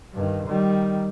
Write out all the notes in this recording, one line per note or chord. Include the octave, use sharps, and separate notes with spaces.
G2 D#3
D#3 G3